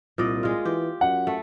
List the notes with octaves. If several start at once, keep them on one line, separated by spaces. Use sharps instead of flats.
C2 A#2 D5 D#5
G#3 F4
E3 G4
F#2 F#5
A3